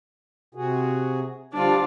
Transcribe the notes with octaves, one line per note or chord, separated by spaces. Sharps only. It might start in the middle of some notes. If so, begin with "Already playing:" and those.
C3 F#4 G#4
D3 F3 G3 D4 F4